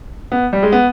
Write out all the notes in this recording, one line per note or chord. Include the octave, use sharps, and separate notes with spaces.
B3
G3
G#3
B3